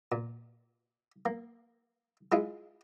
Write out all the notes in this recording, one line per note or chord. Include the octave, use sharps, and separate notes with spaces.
A#2
A#3
G#3 E4 F4 G#4